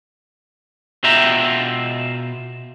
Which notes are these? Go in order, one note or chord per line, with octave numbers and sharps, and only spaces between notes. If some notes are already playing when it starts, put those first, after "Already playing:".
B2 F4 E5 G5 A#5